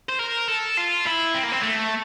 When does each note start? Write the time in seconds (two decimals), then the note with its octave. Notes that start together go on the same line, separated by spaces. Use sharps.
0.09 C5
0.19 A#4
0.48 A4
0.77 F4
1.06 E4
1.35 C4
1.44 A#3
1.53 C4
1.63 A3